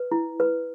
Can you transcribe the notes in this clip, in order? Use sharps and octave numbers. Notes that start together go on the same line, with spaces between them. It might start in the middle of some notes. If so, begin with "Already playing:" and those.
Already playing: B4
E4
B4